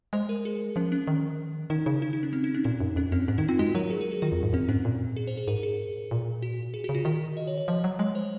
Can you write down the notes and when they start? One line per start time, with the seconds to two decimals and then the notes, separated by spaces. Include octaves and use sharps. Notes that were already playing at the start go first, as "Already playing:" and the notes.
0.13 G#3 C5
0.29 A#4
0.45 G#4
0.76 F3 C#4
0.92 C#4
1.08 D#3
1.70 D#3 D#4
1.86 C#3 D#4
2.02 D#4
2.13 D#4
2.23 C#4
2.33 C4
2.44 D#4
2.54 C#4
2.64 A#2 D#4
2.80 F#2
2.96 F2 C#4
3.12 F#2 C4
3.28 G#2 C#4
3.38 D#3 D#4
3.48 C4 F4
3.59 G#3 F#4
3.75 F#3 A#4
3.91 G#4
4.01 A#4
4.11 G#4
4.22 D#3 F4
4.32 F2
4.43 G#2
4.53 F#2 C4
4.69 G#2 C#4
4.85 A#2
5.16 G#4
5.27 C5
5.37 G#4
5.48 G#2 A#4
5.63 G#4
6.11 A#2
6.42 F#4
6.74 G#4
6.84 F#4
6.89 C#3
6.95 F4
7.05 D#3 F#4
7.37 D#5
7.47 C#5
7.58 C#5
7.68 F3 D#5
7.84 F#3
7.99 G#3 C#5
8.15 C5